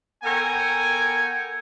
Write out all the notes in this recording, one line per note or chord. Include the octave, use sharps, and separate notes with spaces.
B3 A4 A#4 C#5 G5 G#5